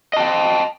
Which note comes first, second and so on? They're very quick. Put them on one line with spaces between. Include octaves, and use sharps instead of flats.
D#5 A5 G5